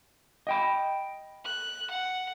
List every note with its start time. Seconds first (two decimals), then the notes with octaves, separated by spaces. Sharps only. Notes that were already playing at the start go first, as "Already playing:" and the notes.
0.47 D#5 G5 B5
1.45 F#6
1.90 F#5